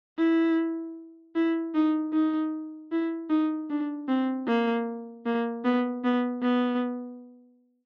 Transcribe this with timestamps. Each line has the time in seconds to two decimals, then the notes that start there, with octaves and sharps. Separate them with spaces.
0.19 E4
1.36 E4
1.75 D#4
2.14 D#4
2.92 E4
3.30 D#4
3.70 D4
4.09 C4
4.47 A#3
5.26 A#3
5.65 B3
6.04 B3
6.42 B3